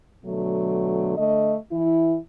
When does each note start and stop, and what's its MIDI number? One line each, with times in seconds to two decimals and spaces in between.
0.25 1.14 47
0.25 1.14 50
0.25 1.14 54
0.25 1.14 57
1.17 1.54 50
1.17 1.54 57
1.17 1.54 75
1.71 2.15 52
1.71 2.15 64